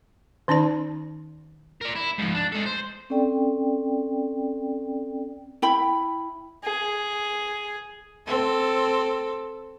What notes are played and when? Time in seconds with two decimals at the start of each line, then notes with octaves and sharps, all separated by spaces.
0.48 D#3 C#4 D#4 D5 A5
1.81 A#4 D5
1.95 E4
2.18 G#2 F3
2.34 D4
2.52 G#3 A4
2.66 C5
3.10 C4 C#4 A4 D5 G5
5.62 E4 G5 B5
6.64 G#4
8.27 C4 A4